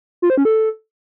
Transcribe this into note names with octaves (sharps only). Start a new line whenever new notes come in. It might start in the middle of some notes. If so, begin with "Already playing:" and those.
F4
C5
C#4
A4